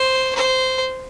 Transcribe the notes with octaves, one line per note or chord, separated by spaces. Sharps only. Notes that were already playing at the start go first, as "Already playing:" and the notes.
Already playing: C5
C5